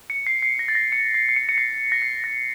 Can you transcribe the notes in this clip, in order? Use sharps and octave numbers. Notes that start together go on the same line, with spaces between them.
C#7
C7
C7
A#6
A6
A#6
C#7
C7
C7
C#7
C#7
C7
A#6
C7
A#6